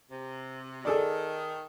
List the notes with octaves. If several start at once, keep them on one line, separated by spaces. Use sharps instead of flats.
C3
D#3 G#4 A4 D5